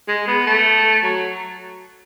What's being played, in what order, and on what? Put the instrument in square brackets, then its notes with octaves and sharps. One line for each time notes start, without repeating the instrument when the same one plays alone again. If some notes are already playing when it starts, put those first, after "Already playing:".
[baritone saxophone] G#3
B3
A3
F#3